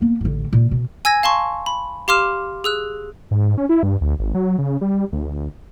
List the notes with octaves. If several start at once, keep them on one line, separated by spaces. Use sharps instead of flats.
A#3 B3
A1 D3
A#2
B2
G#5 E6 G#6 A#6
F5 A5 C6 C#6
B5
G4 F5 C6 D6 F6 E7
G#4 E6 F#6
G#2
C#4
E4
G2
D2
G#1
F#3
C#3
G3
D2